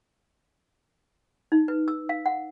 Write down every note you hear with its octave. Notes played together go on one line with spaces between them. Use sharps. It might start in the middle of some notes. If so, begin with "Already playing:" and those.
D#4
B4
E6
F5
F#5